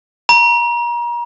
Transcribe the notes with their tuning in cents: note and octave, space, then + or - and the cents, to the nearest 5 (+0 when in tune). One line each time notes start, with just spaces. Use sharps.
A#5 +35